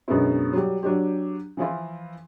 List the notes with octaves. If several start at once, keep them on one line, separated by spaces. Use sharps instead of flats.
F#2 B2 D3 G#3 B3 E4
F#3 G3
F#3 D4 G4
E3 F3 E4 F4